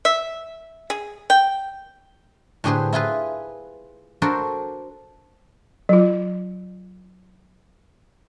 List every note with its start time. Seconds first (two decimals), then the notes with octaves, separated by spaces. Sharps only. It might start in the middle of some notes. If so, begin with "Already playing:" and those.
0.05 E5
0.90 G#4
1.30 G5
2.64 A2 D3 G4 G#4 B4 C5
2.93 E4 F4 G#4 B4
4.22 D4 F#4 A4 A#4 C5 D5
5.89 F#3 F4